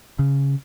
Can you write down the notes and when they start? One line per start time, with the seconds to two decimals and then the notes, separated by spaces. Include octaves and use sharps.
0.19 C#3